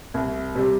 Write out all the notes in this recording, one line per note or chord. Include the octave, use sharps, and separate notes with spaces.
C2
C3 G3